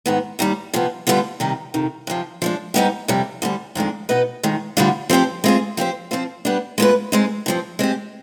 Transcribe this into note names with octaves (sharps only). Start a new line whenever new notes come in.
G#2 D#3 B3
D#2 D#3 G3
C3 F3 B3
D3 G3 B3 F4
C3 D#3 G3
F2 C3 D#3
F2 C3 F3
F3 G#3 D4
G#2 G3 B3 D#4 G4
F2 C3 G3
D2 D3 G3
F2 D#3 G#3 D4
B2 B3 D#4 B4 D#5
F2 D#3 G#3
D2 D3 G3 D4 F4
F3 C4 G4 C5
G#3 C4 F4 G#4
F3 C4 G4 C5
F3 C4 F4 C5
G3 B3 D4
G#3 B3 F4 B4
G#3 C4 D#4
G2 F3 C4
G#3 C4 G4